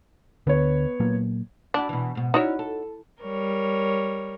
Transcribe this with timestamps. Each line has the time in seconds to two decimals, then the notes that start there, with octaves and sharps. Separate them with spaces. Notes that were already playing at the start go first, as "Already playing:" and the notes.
0.47 D2 D3 B3 C#5
1.00 A#2 F#3 A#3
1.74 D4 E4 F#4 D5
1.89 B2 E3
2.15 G#2 B2
2.34 C#4 D#4 E4 F#4 C#5 D5
2.59 A4
3.23 G3 A#4 C#5